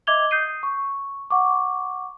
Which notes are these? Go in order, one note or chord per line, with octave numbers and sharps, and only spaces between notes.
D#5 E5 D6 G#6 F7 G7
D#6 G6 C7 D#7
C#6
F#5 C#6 D6